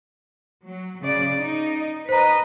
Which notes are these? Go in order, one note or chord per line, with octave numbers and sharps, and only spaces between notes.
F#3
C#3 D5
D#4
B4 C5 D#5 A#5